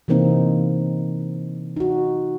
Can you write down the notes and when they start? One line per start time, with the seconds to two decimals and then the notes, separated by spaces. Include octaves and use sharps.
0.08 C3 E3 A#3 C4 D#4
1.76 D#4 F#4